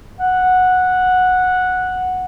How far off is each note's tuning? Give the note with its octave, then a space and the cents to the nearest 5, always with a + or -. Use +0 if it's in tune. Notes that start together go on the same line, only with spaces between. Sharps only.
F#5 -10